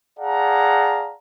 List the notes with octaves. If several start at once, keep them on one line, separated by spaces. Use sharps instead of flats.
G#4 D5 F5 F#5 A5 A#5